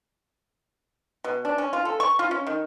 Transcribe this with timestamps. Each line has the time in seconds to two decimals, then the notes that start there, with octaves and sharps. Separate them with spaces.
1.24 B2
1.45 D4
1.58 C#4
1.73 F4
1.85 A4
2.00 C#6
2.19 F4
2.31 C#4
2.47 D#3